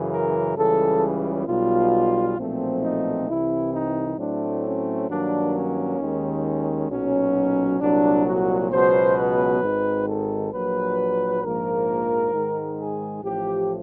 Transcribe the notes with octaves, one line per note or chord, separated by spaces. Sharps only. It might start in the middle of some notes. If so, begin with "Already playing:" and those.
Already playing: F#2 C#3 E3
A#4
C#2 C#3 E3 G3 A4
B1 B2 G3 F4
B1 A#2 F3 A3 C4
D#4
C2 C3 E3 G3 C4 E4
D#4
A2 F#3 A3 C4 D4
C#4
G2 D#3 F#3 A#3 D4
C#4
D#2 D#3 G#3
B1 A#2 F#3 C#4
C2 A#2 F#3 D4
F#4
C#2 B2 F#3 B3 C5
B4
G#1 G#2 D#3
A4
A#1 A#2 F#3 B4
A#1 G#2 F3 A#3 A#4
G#2 D#3 G#3
G#4
A1 A2 F3 G4